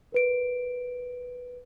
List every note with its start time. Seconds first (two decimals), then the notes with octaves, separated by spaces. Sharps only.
0.12 A#4 B4 D7